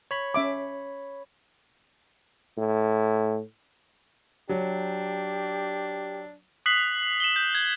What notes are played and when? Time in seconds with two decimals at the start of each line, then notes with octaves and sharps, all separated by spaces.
0.11 C#5 B5
0.34 C#4 E5 D6
2.58 A2
4.49 F#3 D4 G4
6.66 D#6 F#6 B6 C7 F#7
7.20 E7 F#7 G7
7.36 G6
7.55 G#6